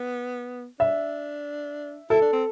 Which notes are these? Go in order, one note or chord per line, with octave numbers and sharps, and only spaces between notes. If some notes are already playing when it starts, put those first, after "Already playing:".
Already playing: B3
D4 E5
E4 A4
D4
C4